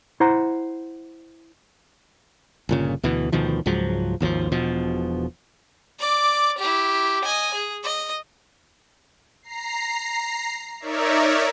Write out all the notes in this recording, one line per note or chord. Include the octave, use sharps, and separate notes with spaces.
E4 C5 F#5 A#5
G1 A#2 C#3
D2 B2 E3
D2 B2 D#3 F3
C#2 G#2 F3 F#3
G#1 D#2 B2 F3
E1 B2 F3
D5 D6
E4 G4
D#5 G#5
G#4
D#5
A#5 C7
D#4 A#4 C#5 D5 E5